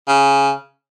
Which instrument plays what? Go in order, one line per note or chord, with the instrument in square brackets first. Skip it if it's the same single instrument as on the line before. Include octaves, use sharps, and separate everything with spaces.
[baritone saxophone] C#3